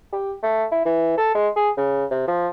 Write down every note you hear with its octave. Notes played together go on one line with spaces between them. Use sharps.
G4
A3
E4
E3
A4
G#3
G#4
C#3
C3
F3